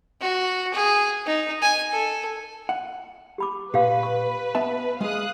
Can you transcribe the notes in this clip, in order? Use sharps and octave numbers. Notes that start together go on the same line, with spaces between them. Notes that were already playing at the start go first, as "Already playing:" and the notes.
F#4
G#4
D#4
G#5
A4
F#5
G4 B5 D6
A#2 G4 B4 F5
C#6
B3 E5 A5
G#3 G#4 F5 D#6 F#6